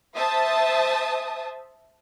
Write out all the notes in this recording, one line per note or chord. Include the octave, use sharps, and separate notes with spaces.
C5 E5 A5 D#6